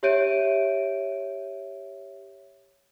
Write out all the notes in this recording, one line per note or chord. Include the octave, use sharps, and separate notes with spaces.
G4 C#5 E5 G6 D7 D#7